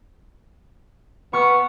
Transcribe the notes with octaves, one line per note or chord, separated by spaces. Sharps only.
B3 C#6 F6